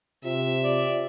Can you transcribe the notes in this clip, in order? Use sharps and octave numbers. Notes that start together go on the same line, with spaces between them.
C3 F4 E5
D5